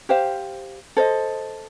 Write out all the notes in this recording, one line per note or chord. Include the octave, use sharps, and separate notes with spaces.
G4 C5 F5
A4 C5 D#5